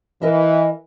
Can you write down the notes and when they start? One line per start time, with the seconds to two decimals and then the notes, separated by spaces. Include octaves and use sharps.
0.22 E3 A#4 D#5 E5